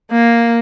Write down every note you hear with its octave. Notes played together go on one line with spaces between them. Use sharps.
A#3